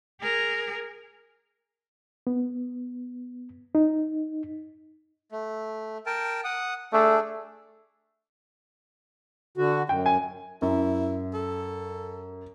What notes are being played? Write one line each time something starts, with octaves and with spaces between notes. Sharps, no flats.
G#4 A#4
B3
D#4
A3
A#4 G5 A5
F#5 D#6
A3 D4 G#4 D5
D3 F#4
F#2 G5
G#5
F#2 E4
A4